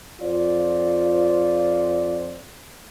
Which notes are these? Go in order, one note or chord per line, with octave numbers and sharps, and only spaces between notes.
F2 F4 C5 D5